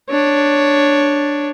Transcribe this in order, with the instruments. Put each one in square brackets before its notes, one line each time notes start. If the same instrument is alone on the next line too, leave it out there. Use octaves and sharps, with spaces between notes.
[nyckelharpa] D4 C#5